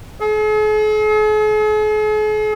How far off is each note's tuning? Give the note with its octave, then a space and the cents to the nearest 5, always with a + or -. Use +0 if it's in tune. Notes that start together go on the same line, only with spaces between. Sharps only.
G#4 +45